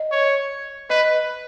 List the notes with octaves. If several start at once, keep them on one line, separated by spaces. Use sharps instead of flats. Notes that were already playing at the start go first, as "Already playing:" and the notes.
Already playing: D#5
C#5
B4 D#5